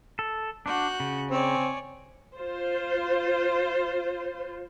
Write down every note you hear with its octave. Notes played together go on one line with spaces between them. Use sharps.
A4
D4 F#4 F#6 G6
C#3
C4 C#5 D5 G#5
F4 C5